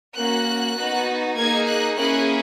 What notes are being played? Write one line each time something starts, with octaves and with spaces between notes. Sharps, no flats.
A#3 C#4 F#4 F#6
B3 D#4 F#4
A#3 D#4 G#4 G#6
F#6
A#3 C#4 E4 G#4 F#6